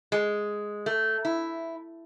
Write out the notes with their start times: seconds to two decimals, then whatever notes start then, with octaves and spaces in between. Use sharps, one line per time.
0.12 G#3
0.86 A3
1.25 E4